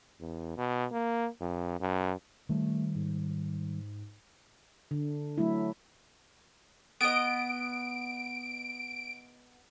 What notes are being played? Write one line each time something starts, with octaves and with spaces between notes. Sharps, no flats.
E2
B2
A#3
F2
F#2
D#3 G3 A3
G#2
D3
F#3 A3 E4
B3 D#5 D7